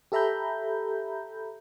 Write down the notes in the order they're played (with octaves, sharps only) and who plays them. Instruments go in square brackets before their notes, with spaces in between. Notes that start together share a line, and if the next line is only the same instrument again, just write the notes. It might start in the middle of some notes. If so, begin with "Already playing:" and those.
[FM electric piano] G4 A4 E5 A#5 B5 G6